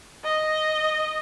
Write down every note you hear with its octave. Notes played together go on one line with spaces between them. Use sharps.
D#5